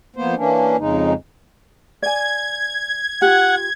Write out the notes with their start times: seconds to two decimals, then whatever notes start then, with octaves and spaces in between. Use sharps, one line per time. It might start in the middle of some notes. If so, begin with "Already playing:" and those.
0.16 F2 A#3 B3 C5
0.37 E3 A#3 C#4 D4
0.78 F2 C#3 G#3 D#4
2.02 D5 G#5 G#6
3.22 F4 G4 F#5